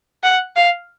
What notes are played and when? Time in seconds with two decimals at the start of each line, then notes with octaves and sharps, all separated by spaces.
0.23 F#5
0.56 F5